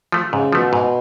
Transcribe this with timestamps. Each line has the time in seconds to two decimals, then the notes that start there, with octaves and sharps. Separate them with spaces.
0.12 F3 A3
0.32 G#2 C#3
0.52 B2 F3 A3
0.73 G#2